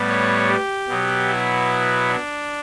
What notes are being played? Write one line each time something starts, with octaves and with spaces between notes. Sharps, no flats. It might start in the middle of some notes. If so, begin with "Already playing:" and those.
Already playing: A2 G3 B3
C#5
G4
B2 F#3 B3
E4
D4